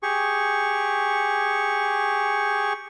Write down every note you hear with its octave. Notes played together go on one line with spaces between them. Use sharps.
G4 G#4 C#6